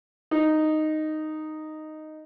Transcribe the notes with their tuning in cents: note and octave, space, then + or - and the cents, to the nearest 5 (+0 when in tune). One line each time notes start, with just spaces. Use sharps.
D#4 -5